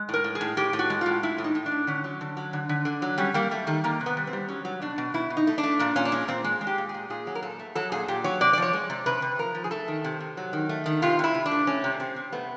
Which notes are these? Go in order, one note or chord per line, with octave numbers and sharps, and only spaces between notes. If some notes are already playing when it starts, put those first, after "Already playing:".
Already playing: G#3
A2 A#4
A2
G#4
A2
A2 G4
A2
F#4
G#3
A2 F4
A2 E4
A2
D#4
A2
D4
A2
D3 C#4
F#3
D3
F#3
D3
D3
D3
F#3
G3 C#4
G3 A#3
G3 A3
D#3 A3
D#3 A#3
C3
B3
G3
C4
G3
F#3 C#4
F#3
B2 D4
B2
B2 E4
B2
D#4
A3
D4
A3
A#2 D4
A#2 C#4
D4
G#3 C#4
A#2 C4
G#3
G#3
G4
A#2
G#4
A#2
A#2 G#4
F#3
A#4
A#2 A4
A3
F#3 A4
A#2 G#4
A#2 G4
F#3 C#5
C3 D5
D5
F3 C#5
G#3
C3
C3 B4
C3
F3 A#4
F3
G#4
A3 A4
D#3
C3
C3
F#3
D#3
A3
D#3
C3 F4
C3 E4
C3
D4
A3
A3 C#4
C3
C3 C4
C3
A3 B3